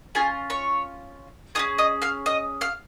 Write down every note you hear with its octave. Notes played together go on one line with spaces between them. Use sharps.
C#4 F4 G#4 G#5
C#5 C#6
C#4 F4 G#4 D#5 D#6
D#5 D#6
F5 F6
D#5 D#6
F5 F6